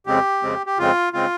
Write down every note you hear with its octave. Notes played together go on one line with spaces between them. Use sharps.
F2 C#3 G#3 C4 G4
F2 C#3 G#3 C4
G4
F2 C#3 G#3 C4 F4
C#3 G#3 C4 F4